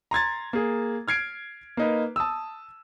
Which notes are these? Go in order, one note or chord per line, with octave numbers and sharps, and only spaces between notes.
A#5 C6 G#6 A6
A#3 G#4
F6 G#6 C7 D7
A#3 D#4 B4
A5 D#6 E6